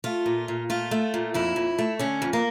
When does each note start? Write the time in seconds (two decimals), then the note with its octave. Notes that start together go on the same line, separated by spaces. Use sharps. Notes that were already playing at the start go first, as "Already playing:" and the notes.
0.04 A3 F4
0.26 A#2
0.48 A#2
0.70 A3 F4
0.91 A3
1.14 A#2
1.34 F2 E4
1.56 F2
1.79 A3
1.99 D3 C#4
2.22 F2
2.33 A#3